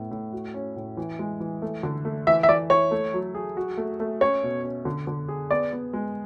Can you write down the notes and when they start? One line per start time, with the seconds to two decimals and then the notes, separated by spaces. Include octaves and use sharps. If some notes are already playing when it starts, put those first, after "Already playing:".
Already playing: A2 B3
0.11 A2
0.32 F#4
0.54 C#4
0.76 A2
0.97 E3
1.19 G#3
1.40 E3
1.62 A3
1.83 D3
2.05 A3
2.27 E3 E5
2.43 E5
2.49 E3 D5
2.70 E4 C#5
2.91 A3
3.14 F#3
3.35 G#4
3.57 F#4
3.77 A3
4.00 A3
4.21 C#4 C#5
4.43 B2
4.64 C#4
4.85 D3
5.07 D3
5.28 G#4
5.51 B3 D5
5.73 B3
5.93 G#3